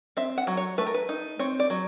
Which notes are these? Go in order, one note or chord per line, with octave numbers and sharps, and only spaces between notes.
C4 E5
F#5
F#3
C#5
A3 B4
A#4
B4
D#4
C4 C#5
D5
F#3